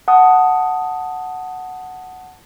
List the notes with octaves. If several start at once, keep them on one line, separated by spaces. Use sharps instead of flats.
F#5 A5 D#6